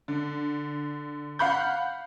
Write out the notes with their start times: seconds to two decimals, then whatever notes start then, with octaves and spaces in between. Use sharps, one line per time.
0.08 D3
1.39 F5 F#5 B5 G6